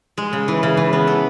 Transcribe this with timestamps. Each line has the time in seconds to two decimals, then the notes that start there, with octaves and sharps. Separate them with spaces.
0.18 G#3
0.33 C#3
0.48 E3
0.63 C#3
0.77 E3
0.93 B3
1.07 A4